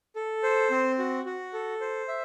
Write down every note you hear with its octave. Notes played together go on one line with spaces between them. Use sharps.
A4
C5
C4
F#4
F#4
A4
C5
E5